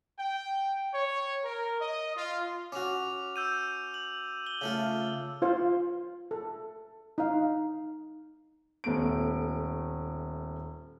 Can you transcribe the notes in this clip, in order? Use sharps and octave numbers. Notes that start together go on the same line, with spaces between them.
G5
C#5
A#4
D#5
F4
C#4 F#4 D6 F7
E6 G6 D#7
F#7
G7
C#3 A3 F4
F4 C5 F5
A4
D#4 F5
D#1 A3 B3 D7